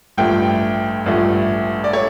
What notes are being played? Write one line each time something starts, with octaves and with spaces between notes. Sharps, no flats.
A1 G2 F3 A3 G5
A1 G2 F3 A3
D5
A3 C#5